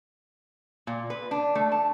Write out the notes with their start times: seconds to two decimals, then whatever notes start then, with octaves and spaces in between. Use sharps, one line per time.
0.87 A#2
1.10 B4
1.31 D4
1.55 A3
1.72 A5